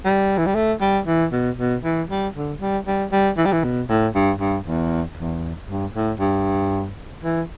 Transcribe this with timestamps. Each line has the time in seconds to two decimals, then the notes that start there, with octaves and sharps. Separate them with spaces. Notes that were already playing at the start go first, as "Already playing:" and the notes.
0.05 G3
0.37 E3
0.46 G3
0.55 A3
0.81 G3
1.07 E3
1.32 B2
1.58 B2
1.84 E3
2.10 G3
2.36 D3
2.60 G3
2.87 G3
3.12 G3
3.37 E3
3.45 G3
3.52 E3
3.64 B2
3.89 A2
4.14 G2
4.40 G2
4.67 E2
5.17 E2
5.68 G2
5.94 A2
6.20 G2
7.23 E3